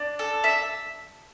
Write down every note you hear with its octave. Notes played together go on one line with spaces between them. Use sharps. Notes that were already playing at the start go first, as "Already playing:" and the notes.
Already playing: D4
A4
E5